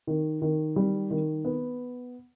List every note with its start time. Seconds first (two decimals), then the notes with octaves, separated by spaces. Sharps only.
0.07 D#3
0.42 D#3
0.76 G3
1.10 D#3
1.45 B3